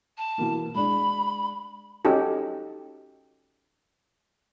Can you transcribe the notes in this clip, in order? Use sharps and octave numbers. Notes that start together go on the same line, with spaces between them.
A5
B2 E3 A#3
G#3 D4 B5
C#4 D#4 F#4 G4 A4